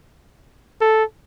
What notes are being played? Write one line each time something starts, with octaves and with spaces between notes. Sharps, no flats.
A4